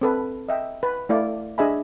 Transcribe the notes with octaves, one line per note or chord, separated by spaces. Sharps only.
C4 A4 B4
D#5 E5 G5
B4
A3 E4 D5 F5
D4 G#4 D#5 E5 G#5 B5